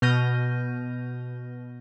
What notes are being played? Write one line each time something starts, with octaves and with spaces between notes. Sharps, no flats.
B2 F6 G6 A#6 D#7